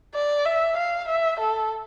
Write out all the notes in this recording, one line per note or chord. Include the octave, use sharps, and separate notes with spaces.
D5
E5
F5
E5
A4